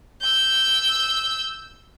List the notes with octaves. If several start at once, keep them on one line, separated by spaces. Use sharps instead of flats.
E6 G6